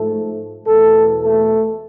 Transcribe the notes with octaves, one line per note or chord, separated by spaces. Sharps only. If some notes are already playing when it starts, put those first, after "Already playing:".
Already playing: G#2 F3 A3 A4
E2 B2 A3 A4
A3 A4